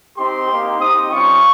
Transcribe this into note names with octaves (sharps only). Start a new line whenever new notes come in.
C4 D#4 G4 C6
A#3 D#4 G4
C4 D#4 G4 D#6
G3 C#4 F4 C#6